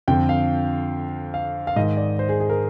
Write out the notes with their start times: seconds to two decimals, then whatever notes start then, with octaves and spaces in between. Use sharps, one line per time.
0.08 F2 D3 G5
0.29 F5
1.34 F5
1.67 F5
1.76 G#2 D#3 D#5
1.97 D5
2.19 C5
2.29 G#4
2.40 G#4
2.50 A#4